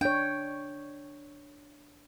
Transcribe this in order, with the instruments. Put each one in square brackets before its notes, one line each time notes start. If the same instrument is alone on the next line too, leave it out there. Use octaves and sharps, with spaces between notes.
[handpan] D4 C#5 [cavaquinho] G5